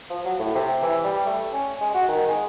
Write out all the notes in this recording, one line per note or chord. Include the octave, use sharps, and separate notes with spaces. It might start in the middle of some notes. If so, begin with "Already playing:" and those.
F3
F#3
A2
C3
E3
G3
A3
C#4
G#3
F#4
D#3
G#3